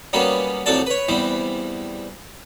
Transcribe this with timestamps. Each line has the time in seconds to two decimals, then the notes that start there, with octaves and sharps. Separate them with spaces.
0.13 F#3 G3 A#3 B3 C#4
0.66 C2 F2 F#3 A3 A4 D5
0.86 B4 C#5
1.08 E2 E3 G3 C4